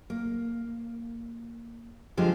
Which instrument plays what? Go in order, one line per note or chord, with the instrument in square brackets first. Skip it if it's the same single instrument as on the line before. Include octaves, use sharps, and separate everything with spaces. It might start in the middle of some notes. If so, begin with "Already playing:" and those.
[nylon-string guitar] A#3
D3 F3 G#3 G4